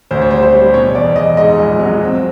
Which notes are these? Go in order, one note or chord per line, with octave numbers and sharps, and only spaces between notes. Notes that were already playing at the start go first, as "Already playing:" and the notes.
D2 C5
C#5
G3 C5
C5
G3
B2 C#5
E2 D5
E2 D#5
G#2 D#5
A#1
F#3
C4